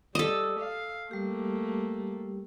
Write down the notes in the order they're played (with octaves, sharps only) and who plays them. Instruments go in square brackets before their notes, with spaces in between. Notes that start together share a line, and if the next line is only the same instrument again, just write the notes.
[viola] G3 [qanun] A4 D#5
[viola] F5
[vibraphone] G3 G4 [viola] A3 A#3